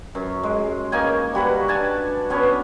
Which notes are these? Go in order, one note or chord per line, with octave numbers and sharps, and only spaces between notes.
F#2
G#3
A#3 C#4 D#4 G#5
G3 F#4 B4 F#5
D4 G#5 A5
B3 C#4 D4 C#5